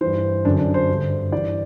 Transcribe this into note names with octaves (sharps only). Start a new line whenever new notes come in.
G2 E3 C5
F#2 D3 D4
D4
C5
G2 D3
G2 E3 D5